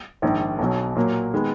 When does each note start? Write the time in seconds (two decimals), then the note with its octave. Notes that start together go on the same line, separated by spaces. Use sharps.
0.22 A#1 G#2 D#3
0.59 B1 B2 F#3
0.96 A#2 F#3 A#3
1.34 D#3 G#3 B3